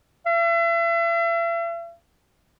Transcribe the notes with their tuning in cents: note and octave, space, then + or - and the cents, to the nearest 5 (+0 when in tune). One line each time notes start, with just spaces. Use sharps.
E5 +40